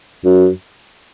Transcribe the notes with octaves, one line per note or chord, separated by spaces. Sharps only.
F#2